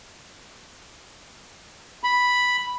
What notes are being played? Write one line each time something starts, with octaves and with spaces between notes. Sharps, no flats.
B5